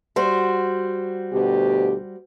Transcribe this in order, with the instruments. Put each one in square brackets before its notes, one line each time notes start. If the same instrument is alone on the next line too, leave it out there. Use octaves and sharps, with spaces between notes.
[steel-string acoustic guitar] G3 F#4 C5
[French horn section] D2 B2 G4